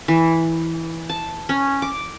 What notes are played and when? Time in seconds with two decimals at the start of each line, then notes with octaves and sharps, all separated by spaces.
0.08 E3
1.09 A5
1.49 C#4
1.82 D6